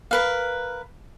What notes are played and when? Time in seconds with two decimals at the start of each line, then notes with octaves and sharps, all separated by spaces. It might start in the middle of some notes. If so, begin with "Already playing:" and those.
0.11 A#4 B4 F5